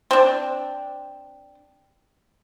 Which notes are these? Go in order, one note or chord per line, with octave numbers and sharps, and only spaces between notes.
C4 D4